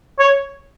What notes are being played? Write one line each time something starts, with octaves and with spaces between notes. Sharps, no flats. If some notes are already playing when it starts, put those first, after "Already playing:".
C#5